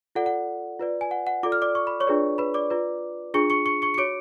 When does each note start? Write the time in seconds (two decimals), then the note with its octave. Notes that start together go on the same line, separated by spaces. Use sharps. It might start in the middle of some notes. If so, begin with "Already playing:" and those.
0.15 F4 A4 D5 F#5
0.26 F#5
0.80 F4 B4 D5
1.01 G#5
1.11 F#5
1.27 F#5
1.43 F4 A4 D5 D6
1.52 F6
1.62 D5 D6
1.75 C#6
1.87 B5
2.00 C#5 C#6
2.07 D4 F4 G#4 B4 D5
2.38 B4 B5
2.54 D5 D6
2.70 F4 B4 D5
3.34 D4 F4 G#4 C#6 C#7
3.50 C#6 C#7
3.66 C#6 C#7
3.82 C#6 C#7
3.94 C#7
3.98 F#4 C#5 D6 D7